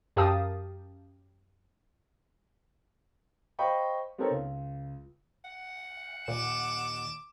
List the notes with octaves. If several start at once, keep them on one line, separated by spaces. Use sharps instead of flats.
F#2 G4 A#4 F5 A5 D#6
C5 D#5 F5 G5 B5 C#6
B3 C4 D#4 A4 A#4 C#5
C#2
F#5
D#2 A#2 D#3 D6 E7